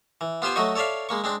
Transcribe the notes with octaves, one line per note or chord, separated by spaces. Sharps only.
E3
B3 F4 G4 C5 G5 G#5
F#3 A3 F#4 D#5 C#6
A4 C#5 D5 E5 F5
G#3 A#3 C#6
G#3 C4 D4